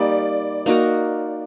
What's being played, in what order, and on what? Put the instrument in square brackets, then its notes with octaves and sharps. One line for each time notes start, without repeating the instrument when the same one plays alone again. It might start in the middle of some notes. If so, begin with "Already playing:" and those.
Already playing: [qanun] G3 A#3 D#4 [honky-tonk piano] D5
[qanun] A#3 D#4 F#4 A#4